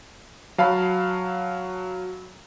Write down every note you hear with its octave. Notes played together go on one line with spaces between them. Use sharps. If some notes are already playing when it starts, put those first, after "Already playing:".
F#3 F5 A5 B5